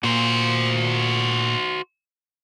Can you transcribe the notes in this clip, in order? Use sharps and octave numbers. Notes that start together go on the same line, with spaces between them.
A#2 F#4 C5